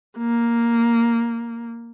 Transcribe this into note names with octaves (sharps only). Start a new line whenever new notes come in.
A#3